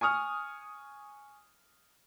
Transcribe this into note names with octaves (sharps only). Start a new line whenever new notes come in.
G#5 C#6 D#6 F6